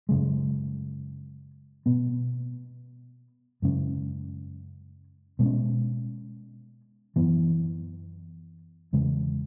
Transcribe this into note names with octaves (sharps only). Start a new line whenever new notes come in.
F#2 C#3 G#3
B2 B3
F#2 C#3 G#3 C#4
B2 G#3 C#4
F#2 E3 B3
E2 C#3 G#3